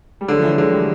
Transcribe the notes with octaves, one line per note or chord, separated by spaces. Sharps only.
G3
D3 F#3 G#3
F3
E3 F#3
D3 F#3 G#3
G3 A3